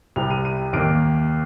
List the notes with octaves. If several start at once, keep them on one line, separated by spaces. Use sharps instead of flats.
C2 C3 G3 F7
D#7
D#7
D#2 D#3 A#3 D7